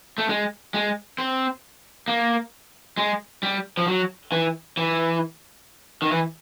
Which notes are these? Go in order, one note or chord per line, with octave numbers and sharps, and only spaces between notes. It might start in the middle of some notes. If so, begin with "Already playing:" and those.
A3
G#3
G#3
C4
A#3
G#3
G3
F3
F#3
E3
E3
D#3
E3